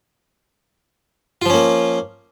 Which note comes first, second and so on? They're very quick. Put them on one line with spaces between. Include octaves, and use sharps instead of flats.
F4 F3 C#4 A#3